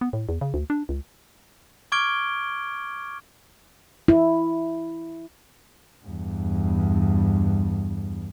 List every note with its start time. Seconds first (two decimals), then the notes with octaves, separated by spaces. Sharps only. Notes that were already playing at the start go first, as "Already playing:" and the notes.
0.01 B3
0.13 A2
0.29 E2
0.41 C#3
0.54 D2
0.70 D4
0.89 C#2
1.92 C#6 D6 F6 G#6 D7 G7
4.08 E4
6.04 E2 G2